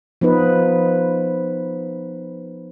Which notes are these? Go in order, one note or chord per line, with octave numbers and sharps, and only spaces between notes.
F3 B3 D#4 B4